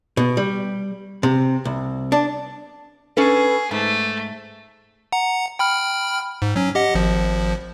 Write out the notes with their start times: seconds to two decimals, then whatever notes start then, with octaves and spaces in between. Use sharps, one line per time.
0.17 B2
0.37 G3
1.23 C3
1.65 C2
2.12 D4
3.17 C#4 G#4 A4 B4
3.71 G#2 A3
5.12 F#5 A#5
5.59 G5 B5 F6
6.42 G#2
6.56 F#3 C#4
6.75 G4 D#5 F#5
6.95 G#1 F3